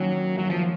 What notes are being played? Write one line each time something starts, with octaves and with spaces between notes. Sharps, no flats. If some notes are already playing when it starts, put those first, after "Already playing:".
Already playing: F#2 D#3 F#3 A#3 C#4
F#2 F#3
F3